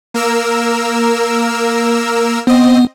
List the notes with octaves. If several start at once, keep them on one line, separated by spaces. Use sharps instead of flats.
A#3 A#4 E6
B3 C4 D#5